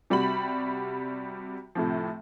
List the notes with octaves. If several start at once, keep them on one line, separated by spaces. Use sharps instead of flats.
C3 G3 F#4 B5 F#7
A2 C3 F3